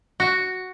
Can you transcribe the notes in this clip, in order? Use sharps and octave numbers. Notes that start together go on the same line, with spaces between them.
F#4